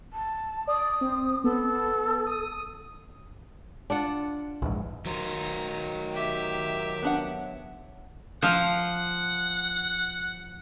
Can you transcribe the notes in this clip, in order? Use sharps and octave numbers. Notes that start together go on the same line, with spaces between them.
A5
D5 D#6
C4
B3 A4
D#6
D4 F4 F#5
A#1 E2 G#2
D#3 F#3 C5 A#5
G4 E5
B3 D4 F#5
F3 F5 F#5